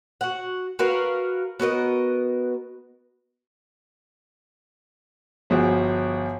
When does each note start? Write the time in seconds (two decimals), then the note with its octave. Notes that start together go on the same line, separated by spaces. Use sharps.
0.21 F#4 F#5
0.79 F#4 A#4 B4 F5
1.59 B3 F#4 A#4 D#5
5.50 G1 F3 F#4 G#4